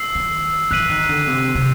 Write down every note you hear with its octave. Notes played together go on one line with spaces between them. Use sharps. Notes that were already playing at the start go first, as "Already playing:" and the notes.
Already playing: E6 C7
D#3
E3 F#6 B6 D#7 F#7
D#3
D3
C3
C3